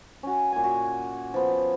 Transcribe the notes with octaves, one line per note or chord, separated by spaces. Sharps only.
C#4 F#4
A#2 G#5
F#4
F3 B3